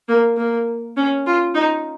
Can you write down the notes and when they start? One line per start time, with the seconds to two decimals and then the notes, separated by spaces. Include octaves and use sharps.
0.08 A#3
0.37 A#3
0.97 C#4
1.26 F4
1.55 D#4